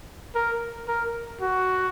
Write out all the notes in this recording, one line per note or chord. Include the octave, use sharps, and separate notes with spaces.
A#4
A#4
F#4